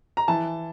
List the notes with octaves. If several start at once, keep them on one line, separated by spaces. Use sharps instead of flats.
A#5
E3 A5